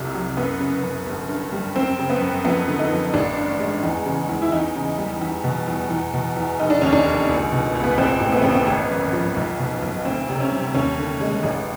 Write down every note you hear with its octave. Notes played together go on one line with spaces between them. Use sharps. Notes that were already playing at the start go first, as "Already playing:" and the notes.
Already playing: C2 F2 C3
F#3
F#2 B3
C#3
F#2
G1
G2
G3
F#2 C4
C#3
B3
F#2
F2 B3
D3
D#4
F2
A1 D4
G2
G#3
E2
C#3
E2
E4
E2 D#4
C#3
G3
E2
B2
E2
E2
B2
E2
F1 D#4
D4
D#2 C#4
D4
F1
C#2
B2
C#2
B3
A1 C4
A2
B3
A1 C4
B3
G#1
F#2
F3
B1
B2
B1
D2 C4
C3
C#4
G3
D#2 C#4
D3
G#3
A1